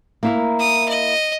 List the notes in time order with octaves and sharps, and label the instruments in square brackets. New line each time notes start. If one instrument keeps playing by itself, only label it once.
[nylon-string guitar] A#3 E4 A#4
[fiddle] D#6
D#5